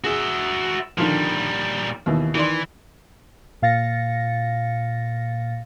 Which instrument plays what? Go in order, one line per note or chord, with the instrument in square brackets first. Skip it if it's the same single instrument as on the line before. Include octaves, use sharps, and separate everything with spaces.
[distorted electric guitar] F#4 E5 [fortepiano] G#4
[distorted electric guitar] A#2 G3 [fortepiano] D3 D#3 F3
[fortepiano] D#2 B2 E3
[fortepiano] D#3 D5 C6 [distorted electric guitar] E3
[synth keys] A#2 F5 A6 A#6 C#7